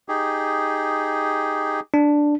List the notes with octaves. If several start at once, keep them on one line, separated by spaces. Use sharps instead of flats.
D#4 G4 G#4
D4